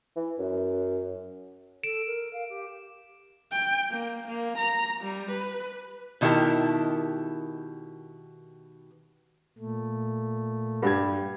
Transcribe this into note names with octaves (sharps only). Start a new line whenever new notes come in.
E3
F#2
A4 D7 E7
A#4
F5
G4
G5
A#3
A#3
A#5
G3
B4
B2 D#3 E4 G4 A#4 A5
A#2 A3
G2 G4 G#6